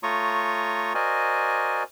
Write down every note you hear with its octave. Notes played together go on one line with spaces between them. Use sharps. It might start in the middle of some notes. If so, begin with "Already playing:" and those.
A3 F4 C#5 A#5 C#6 D#6
F#4 A#4 C5 D5 D#5 G#5